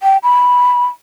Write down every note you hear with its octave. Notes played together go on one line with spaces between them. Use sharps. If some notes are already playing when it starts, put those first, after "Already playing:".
G5
B5